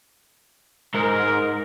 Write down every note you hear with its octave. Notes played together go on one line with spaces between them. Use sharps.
G#2 A#4